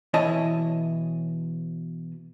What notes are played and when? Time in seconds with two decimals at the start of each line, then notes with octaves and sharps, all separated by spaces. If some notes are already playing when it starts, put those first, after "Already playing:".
0.14 B2 E3 E4 C#5 D#5 A5